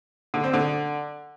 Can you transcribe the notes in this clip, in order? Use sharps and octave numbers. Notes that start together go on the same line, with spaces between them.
D3
C4
D3